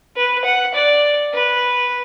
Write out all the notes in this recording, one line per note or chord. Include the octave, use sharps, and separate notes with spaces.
B4
F#5
D5
B4